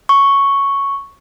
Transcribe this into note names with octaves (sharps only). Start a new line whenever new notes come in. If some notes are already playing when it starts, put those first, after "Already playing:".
C#6